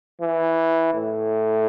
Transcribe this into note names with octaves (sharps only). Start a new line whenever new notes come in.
E3
A2